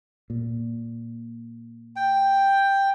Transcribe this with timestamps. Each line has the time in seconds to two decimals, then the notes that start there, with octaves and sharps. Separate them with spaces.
0.30 A#2
1.96 G5